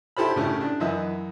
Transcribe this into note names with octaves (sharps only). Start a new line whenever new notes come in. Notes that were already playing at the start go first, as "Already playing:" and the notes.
E4 G4 A4 C5 B5
A2 C#3 A3 E4 G4
D4
F#2 E3 D#5 E5